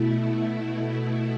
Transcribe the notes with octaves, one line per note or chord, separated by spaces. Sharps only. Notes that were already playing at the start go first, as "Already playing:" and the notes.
Already playing: B2 A3 E4